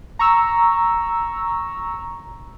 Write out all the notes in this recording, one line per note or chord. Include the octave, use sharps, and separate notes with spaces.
A#5 C#6 E6